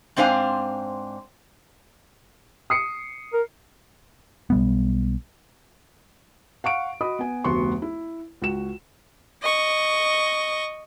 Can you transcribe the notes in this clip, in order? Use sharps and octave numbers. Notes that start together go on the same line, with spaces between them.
G#2 C4 D4 C5 F5 G#5
D#6 C7 C#7
A#4
B1 G3 B3
F5 F#5 C#6 D7
F#4 D#5 B5 D#6
B3 G#5
F1 D2 B3 F#4 C6 C#6
E4
C#2 F#4 E7
D#5 C#6